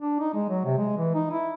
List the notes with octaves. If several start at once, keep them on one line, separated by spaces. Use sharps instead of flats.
D4
D#4
G#3
F#3
C3
G#3
E3
D#4
E4